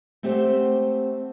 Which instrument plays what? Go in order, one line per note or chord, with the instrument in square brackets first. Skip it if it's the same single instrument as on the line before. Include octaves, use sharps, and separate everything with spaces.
[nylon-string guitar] A3 C4 G4 C5 F#5